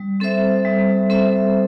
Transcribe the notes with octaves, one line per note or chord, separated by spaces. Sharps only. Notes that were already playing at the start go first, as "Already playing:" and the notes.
Already playing: G3
C4 A4 C5 E5
G3
C4 A4 C5 E5